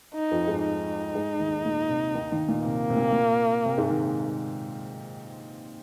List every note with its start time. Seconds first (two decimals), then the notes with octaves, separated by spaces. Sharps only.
0.15 D#4
0.31 F2 F3
0.47 G#2 G#3
0.65 D#4
1.15 G#2 G#3
1.39 D#2 D#3
1.65 A#2
1.89 C3
2.14 D#2 D#3
2.31 D#2 D#3
2.48 A#2
2.64 C3 A#3
2.90 C3
2.96 A#2
3.12 A#2
3.65 C3
3.78 G#2 G#3
3.90 D#3